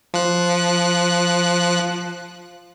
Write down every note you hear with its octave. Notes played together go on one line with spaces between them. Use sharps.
F3 F#6